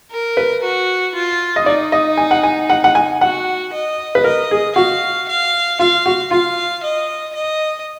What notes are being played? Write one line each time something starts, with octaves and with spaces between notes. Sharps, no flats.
A#4
B4
F#4
F4
D#5
D#4 D5
D#5
G#5
F#5
G#5
F#5
F#5
G#5
F#4 F#5
D#5
B4
A#4 D#5
G#4
F#4 F5
F5
F4 F5
F#4
F4 F5
D#5
D#5